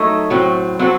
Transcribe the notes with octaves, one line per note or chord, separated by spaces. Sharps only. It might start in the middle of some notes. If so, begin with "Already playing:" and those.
Already playing: F#3 A3 D#4 A4
A2 F#3 C4
F#3 C4 F#4 A4